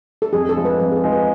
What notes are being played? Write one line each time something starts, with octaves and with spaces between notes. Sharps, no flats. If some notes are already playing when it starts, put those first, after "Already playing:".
A4
F2 G#4
A4
F3 G#3
B4
F2 B4
G#4
A4
F3 G#3
B4